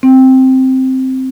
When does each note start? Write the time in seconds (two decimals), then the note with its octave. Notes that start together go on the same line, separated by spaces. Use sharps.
0.03 C4